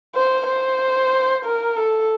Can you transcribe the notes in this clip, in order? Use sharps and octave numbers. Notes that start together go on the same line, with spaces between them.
C5
C5
A#4
A4